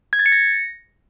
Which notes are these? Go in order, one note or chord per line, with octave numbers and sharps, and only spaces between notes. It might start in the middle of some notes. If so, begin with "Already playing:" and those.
G#6
A6
C#7
A#6